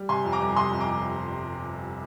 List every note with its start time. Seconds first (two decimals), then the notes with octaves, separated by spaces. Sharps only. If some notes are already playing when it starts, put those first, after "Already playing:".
Already playing: G3
0.09 C3 G#5 C6
0.25 F2
0.32 A#5 D6
0.40 G1
0.56 C3 C6 D#6
0.73 F2
0.80 A#5 D6